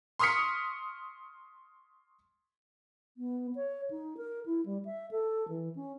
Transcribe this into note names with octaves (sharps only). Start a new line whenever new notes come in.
C6 C#6 D#6 F6 B6 C#7
B3
C#5
D#4
A#4
E4
G3
E5
A4
E3
C#4